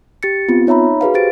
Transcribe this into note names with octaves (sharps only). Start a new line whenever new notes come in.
G4 A6 C#7
B3 C4 F4
D#4 C#5 E5 A#5 B5
F#4 G#4 B4 F5
G4 C5 A6 D7